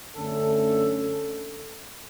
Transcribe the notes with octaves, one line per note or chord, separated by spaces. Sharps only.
F#2 D3 A3 C#4 A4